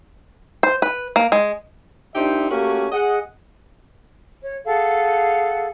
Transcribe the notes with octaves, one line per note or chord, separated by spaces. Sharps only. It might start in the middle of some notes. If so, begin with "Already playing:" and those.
C5
B4
A#3
G#3
A#2 D4 D#4 G4 C5 E5
A3 A#3 C#4 F#4 G4
G#4 D#5 F#5
C#5
G#4 A4 F5 F#5